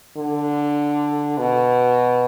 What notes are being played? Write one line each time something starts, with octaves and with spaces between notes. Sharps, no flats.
D3
B2